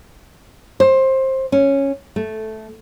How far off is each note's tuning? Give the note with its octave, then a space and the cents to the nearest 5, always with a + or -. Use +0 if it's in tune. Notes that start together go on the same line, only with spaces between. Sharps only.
C5 +20
C#4 -5
A3 -10